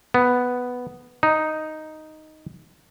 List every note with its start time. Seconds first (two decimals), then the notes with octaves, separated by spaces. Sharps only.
0.14 B3
1.23 D#4